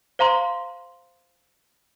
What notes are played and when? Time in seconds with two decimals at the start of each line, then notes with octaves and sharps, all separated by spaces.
0.19 C5 F5 A#5 C6